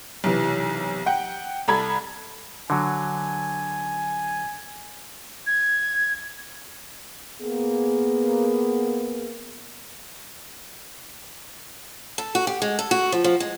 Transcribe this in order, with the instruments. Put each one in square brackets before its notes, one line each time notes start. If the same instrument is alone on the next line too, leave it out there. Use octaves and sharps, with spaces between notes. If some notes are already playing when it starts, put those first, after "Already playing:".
[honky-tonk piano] B1 C3 E3
F#5 G5
C2 A4 A#5 B5 G#6
[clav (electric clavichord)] D3 F#3 [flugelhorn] G#5
[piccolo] G#6
[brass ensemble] A#3 B3 G#4
[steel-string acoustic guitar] A4
F#4
G4
G#3
A4
F#4
F3
F3
G#3